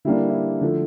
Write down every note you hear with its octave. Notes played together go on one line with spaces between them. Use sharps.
D3 G3 A#3 D4 E4
E4
D3 F3 A3